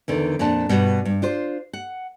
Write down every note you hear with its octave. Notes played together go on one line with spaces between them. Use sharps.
E2 D3 D#3
F2 A#2 D4 A5
G2 B2 G3
G2
D4 F4 C5
F#5